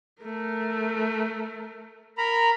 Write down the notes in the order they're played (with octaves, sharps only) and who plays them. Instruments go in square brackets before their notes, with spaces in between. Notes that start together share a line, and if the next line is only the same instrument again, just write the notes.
[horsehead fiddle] A3 A#4
[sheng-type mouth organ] A#4 A#5 B5